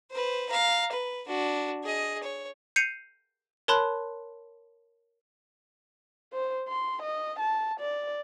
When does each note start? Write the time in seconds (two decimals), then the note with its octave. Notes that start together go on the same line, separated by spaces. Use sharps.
0.11 B4 C5
0.49 F5 A#5
0.92 B4
1.28 D4 F#4
1.84 G#4 D#5
2.23 C#5
2.76 G6 C7 C#7 D#7 F7
3.68 A#4 C#5 A5 B5 C6 F#6
6.33 C5
6.68 C6
7.02 D#5
7.39 A5
7.80 D5